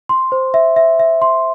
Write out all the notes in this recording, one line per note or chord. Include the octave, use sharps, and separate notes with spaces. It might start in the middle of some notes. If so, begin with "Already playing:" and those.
C6
C5
E5
E5
E5
C6